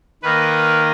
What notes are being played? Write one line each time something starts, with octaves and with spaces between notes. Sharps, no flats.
D#3 A#3 D#4 B4